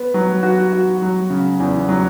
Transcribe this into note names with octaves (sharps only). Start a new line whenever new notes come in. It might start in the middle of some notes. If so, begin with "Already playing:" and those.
Already playing: B3
F#3
F#4
F#4
F#3
C#3
E2
F#3